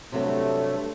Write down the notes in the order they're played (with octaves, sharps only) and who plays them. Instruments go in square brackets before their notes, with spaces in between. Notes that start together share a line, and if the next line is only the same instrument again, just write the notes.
[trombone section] G2 A3 [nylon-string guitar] C3 F#3 B3